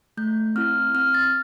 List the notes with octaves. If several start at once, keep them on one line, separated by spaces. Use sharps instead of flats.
A3 G6
C4 E4 F6
C4 F6
A6